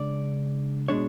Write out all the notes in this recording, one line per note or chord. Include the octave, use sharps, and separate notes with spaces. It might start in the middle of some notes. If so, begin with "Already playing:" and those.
Already playing: C#3 G#3 D4 D5
B2 G#3 D4 C#5